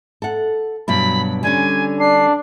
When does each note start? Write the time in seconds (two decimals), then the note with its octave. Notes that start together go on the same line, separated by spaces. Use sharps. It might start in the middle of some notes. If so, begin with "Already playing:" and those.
0.22 A4 F#5
0.88 G2 B2 F#3 B5
1.43 D3 G3 C#4 G#5
2.00 D4 C7